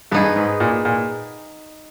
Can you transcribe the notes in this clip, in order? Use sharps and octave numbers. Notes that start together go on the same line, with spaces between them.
G2 B3 D#4 G#4
G#2
A#2
A#2